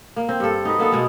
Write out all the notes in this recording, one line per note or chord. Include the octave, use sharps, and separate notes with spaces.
A#3
C4
G2 A4
D#4 F#4 B4 D#5
A#3 B3 D4 A4
B2 G#3